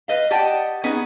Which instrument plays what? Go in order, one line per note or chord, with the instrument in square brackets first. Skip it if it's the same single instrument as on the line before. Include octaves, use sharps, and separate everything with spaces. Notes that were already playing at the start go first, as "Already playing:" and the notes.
[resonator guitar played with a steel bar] B4 D#5 F5
G4 D5 D#5 F#5 G5 A5
B3 C#4 D#4 G#4 B4